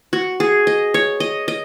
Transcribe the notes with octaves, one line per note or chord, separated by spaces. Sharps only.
F#4
G#4
D#5
C#5
D#5
D#5